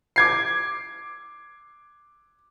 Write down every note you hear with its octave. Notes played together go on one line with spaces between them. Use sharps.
D6 G#6 C7